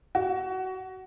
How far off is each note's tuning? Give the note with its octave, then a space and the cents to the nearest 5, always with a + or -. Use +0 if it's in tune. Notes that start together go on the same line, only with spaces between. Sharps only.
F#4 +20